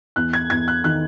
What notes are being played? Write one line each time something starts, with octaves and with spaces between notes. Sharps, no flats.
E2 F#6
G#6
E2 G#6
F#6
D#3 F#6